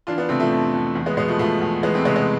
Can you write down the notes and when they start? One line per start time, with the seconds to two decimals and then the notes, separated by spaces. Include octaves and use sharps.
0.07 E3 D4 F4
0.18 B3 D4
0.29 C3 A3 C4
0.40 F3 A3
0.52 F2
0.74 F2
0.95 E2
1.06 G#3 B3
1.17 B2 G#3 B3
1.28 F3 A3
1.39 B2 F3 A3
1.61 E2
1.83 E3 G#3 B3
1.94 A3 C4
2.05 C3 G#3 B3
2.16 G#3